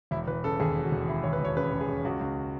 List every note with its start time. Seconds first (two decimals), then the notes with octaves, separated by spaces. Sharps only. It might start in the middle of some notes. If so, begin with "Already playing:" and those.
0.11 E1 E4
0.27 E1 B4
0.44 C#3 A4
0.60 D#2 G#4
0.76 E1
0.84 F#4
0.92 E1
1.08 E1 E4
1.23 D#2 C#5
1.33 B4
1.41 E1 C#5
1.57 C#3 B4
1.72 C#3
1.81 G#4
1.88 C#3
2.05 C#2 F#4
2.21 C#2